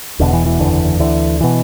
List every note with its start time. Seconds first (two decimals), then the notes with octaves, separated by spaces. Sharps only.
0.20 E1 E2 B2 D3
0.33 E3
0.46 E3
0.60 F#1 E2 D3
1.00 D2 D3 E3
1.41 B2 E3